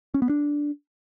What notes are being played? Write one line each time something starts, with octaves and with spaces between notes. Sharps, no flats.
C#4
B3
D4